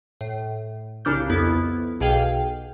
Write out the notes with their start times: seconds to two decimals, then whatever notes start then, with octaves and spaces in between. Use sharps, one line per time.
0.21 A2
1.05 C2 C#3 D4 D6 F6 G6
1.30 F2 B3 E4
2.00 B1 B2 G#4 F5 G5